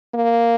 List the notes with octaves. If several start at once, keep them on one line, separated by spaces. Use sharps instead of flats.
A#3